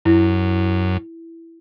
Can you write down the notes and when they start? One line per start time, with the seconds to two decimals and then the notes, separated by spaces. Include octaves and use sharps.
0.05 F#2 E4